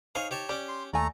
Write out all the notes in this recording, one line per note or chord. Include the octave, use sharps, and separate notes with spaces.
D#4 G#4 C5 C#5 F5
G4 C#5 A5
C#4 G4 D5
C6
D#2 A3 D5 G#5 A#5